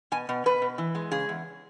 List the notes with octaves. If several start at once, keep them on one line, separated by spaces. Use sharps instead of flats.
B2 G#5
B2
B2 B4
B2
E3
G#3
C#3 G#4
E2